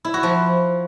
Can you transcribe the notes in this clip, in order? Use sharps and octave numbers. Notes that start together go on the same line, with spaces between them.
E4
F#4
F3